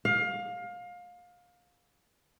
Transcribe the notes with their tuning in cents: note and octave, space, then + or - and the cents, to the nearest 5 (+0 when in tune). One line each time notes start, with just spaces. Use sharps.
F5 +25